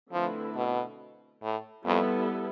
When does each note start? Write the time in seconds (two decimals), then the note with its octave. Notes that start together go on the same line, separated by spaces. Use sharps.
0.13 D3 F3 A3 C4 E4 B4
0.56 B2
1.43 A2
1.86 F2 G3 B3 E4 A4